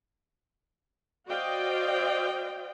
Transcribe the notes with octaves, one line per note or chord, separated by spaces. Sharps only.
F#4 C5 D5 D#5 F5 G5